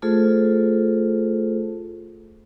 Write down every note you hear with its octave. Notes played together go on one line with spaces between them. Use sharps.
A3 F4 G#4 A4 C5